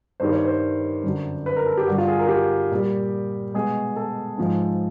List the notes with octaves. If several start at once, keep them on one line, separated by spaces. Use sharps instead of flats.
G2 D#3 G3 C5
C#5
C5
F#2 D3 F#3
B4
A#4
A4
G4
G2 D3 F#3 F#4
F4
G#4
A#4
G4
A#2 G3
B2 G#3 G#4
A4
G#2 F3 G#3